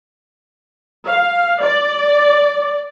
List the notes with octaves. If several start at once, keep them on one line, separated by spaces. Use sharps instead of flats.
F5
D5